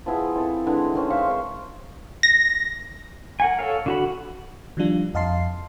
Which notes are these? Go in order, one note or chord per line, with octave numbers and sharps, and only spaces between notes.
F3 B3 E4 G#4
C4 E4 A4
D3 E3 G#3
D#3 C4 C#4 C5
C4 E5 F5 C#6
C5 C6
A#6
A#4 F#5 G#5
A4 C#5 F5
D3 F#4 B5
D#3 F3 G3 D4 F4
F2 D#5 F5 A5 C6 C7